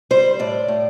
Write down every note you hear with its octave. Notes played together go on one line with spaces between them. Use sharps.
G3 C5
A2 D5
A2